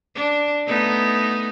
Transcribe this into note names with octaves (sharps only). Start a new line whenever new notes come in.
D4
A3 B3 D#4